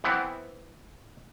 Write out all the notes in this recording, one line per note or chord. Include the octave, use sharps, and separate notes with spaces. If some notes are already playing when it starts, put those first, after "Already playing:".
E3 B3 C4 E4